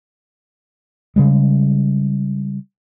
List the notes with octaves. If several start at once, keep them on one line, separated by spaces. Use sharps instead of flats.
C#3 G3 G#3